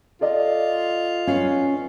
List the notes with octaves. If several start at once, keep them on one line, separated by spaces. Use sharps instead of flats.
F4 A4 D5 D#5
C#4 B4 F5